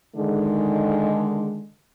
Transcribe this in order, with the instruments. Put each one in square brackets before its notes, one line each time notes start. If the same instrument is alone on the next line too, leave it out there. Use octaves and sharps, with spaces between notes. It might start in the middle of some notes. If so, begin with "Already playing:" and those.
[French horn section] D3 D#3 G#3